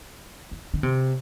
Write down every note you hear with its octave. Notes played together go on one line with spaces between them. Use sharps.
E3
D3
C3